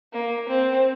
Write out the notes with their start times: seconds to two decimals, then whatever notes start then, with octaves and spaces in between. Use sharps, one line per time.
0.13 A#3
0.49 C4